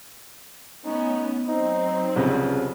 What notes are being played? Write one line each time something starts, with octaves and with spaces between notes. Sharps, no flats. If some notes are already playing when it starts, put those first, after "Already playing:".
A3 B3 C#4 D#4
F#3 C4 D#4
C2 F2 C#3 B4